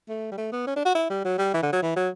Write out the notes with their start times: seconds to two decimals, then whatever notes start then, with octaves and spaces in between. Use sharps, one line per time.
0.09 A3
0.32 G3
0.38 A3
0.52 B3
0.67 C#4
0.76 D4
0.85 F#4
0.95 E4
1.10 G3
1.25 F#3
1.38 G3
1.54 E3
1.63 D3
1.73 F#3
1.82 E3
1.96 F#3